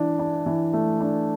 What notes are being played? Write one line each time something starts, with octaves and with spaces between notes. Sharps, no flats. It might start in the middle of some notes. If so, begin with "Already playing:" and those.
Already playing: E3 D4
D4
E3
A3
D4